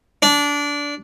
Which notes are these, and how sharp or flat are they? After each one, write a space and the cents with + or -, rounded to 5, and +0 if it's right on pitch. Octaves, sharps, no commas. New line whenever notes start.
D4 -20